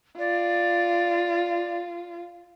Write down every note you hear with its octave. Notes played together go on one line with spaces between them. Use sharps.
F4 D5